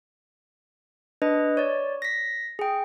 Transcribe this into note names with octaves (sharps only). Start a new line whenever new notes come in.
D4 B4 D#5
C#5 D5
A#6 B6
G#4 G5